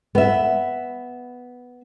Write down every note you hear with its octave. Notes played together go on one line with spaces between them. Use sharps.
B3 E5